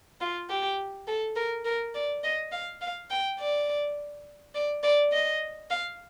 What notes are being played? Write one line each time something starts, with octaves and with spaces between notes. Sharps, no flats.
F4
G4
A4
A#4
A#4
D5
D#5
F5
F5
G5
D5
D5
D5
D#5
F5